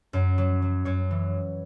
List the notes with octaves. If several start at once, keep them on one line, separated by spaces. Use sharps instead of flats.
F#2
F#3
F#3
F#2 C#5
E3